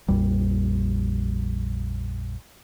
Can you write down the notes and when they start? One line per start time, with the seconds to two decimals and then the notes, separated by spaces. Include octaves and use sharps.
0.08 A#1 F2 G3